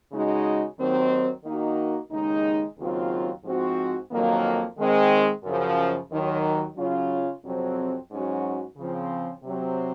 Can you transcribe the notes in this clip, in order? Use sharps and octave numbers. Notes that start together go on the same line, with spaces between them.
C#3 G#3 D#4 F#4
D#2 D#3 F#3 C4
D#3 A#3 D#4 F#4
D#2 C#3 G#3 D#4
D#2 C#3 F#3 C4 F4
G#2 F3 C4 F#4
F2 D#3 F#3 A#3
D#3 G#3 C4
F#2 C#3 F3
D#2 D#3 F#3
C#3 F#3 C#4 F4
F2 C3 F#3 C4
G#2 F#3 C#4 F#4
C#3 F3 C4
C3 F#3 C4